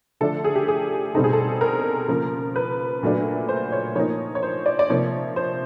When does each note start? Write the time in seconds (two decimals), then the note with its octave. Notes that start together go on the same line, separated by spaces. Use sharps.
0.21 D3 F3 A3 D4 A4
0.44 G#4
0.55 G4
0.68 G#4
1.15 B2 G3 C4 D#4 A4
1.24 G#4
1.33 A4
1.61 A#4
2.08 C#3 F3 A#3
2.56 B4
3.03 A#2 F#3 A3 D4
3.49 C5
3.72 C#5
3.95 F3 A#3 D#4 C#5
4.35 C#5
4.43 C5
4.66 D5
4.79 D5
4.89 C3 F3 A#3 C#5
5.36 C5